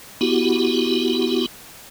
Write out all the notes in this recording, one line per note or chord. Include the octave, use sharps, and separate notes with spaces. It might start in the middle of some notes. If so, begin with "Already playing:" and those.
B3 E4 F#4 G4